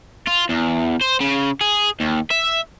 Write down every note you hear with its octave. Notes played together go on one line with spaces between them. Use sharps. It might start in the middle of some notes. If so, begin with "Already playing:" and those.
F4
E2
C5
C#3
G#4
D#2
E5